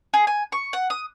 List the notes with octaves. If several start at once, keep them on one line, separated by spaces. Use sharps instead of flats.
G#4
G#5
C#6
F#5
D#6